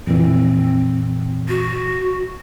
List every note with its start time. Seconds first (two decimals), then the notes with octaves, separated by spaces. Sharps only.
0.07 F2 A#2 E3 C4
1.49 F#4